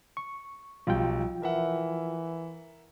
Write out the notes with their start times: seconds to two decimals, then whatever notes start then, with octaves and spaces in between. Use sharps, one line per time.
0.17 C#6
0.87 B1 F3 G3 F4 G5
1.42 E3 A#4 E5 F#5